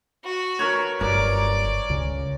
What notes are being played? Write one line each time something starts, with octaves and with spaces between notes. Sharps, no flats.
F#4
A#4 B4 C#5
F#1 G2 A#4 D5
C#2 C#3